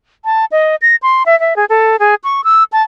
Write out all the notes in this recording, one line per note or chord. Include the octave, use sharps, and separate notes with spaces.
A5
D#5
A#6
C6
E5
E5
G#4
A4
G#4
C#6
E6
A5